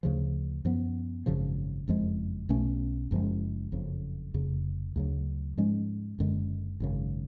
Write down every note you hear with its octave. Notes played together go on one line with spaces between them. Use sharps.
D2 C#3 F3
F#2 F3 B3
G#1 F#2 C#3 F3
F#1 F2 F3 G#3
B1 B2 A3 C#4
F#1 F#2 F3 G#3
F#1 F2 C#3
F1 F2 C#3
D2 C#3 F#3
G#2 F3 G#3 C#4
F#1 F#2 D3 G#3
G#1 F#2 C#3